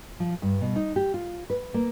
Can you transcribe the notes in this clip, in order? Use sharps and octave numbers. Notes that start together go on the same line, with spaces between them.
F3
G2
B2
D#4
G4
F4
B4
A#3